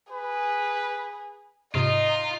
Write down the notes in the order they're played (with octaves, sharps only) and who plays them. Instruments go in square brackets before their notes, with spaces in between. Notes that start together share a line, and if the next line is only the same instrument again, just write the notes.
[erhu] G#4 [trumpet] B4
[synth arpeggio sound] G#2 C3 [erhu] D#4 [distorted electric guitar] F4 [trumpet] D#5